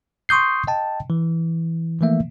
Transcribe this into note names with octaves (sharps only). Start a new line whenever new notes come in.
C6 C#6 D#6 G6 C7
D#5 G5 A5
E3
E3 F3 A3 A#3 E5